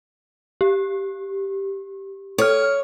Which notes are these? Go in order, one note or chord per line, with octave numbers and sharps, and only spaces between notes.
G4
A4 C#5 F6